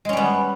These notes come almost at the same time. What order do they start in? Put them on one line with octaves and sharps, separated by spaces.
G#3 C#4 G3 B3